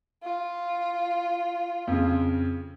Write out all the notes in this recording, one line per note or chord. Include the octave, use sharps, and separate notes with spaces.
F4
F2 C#3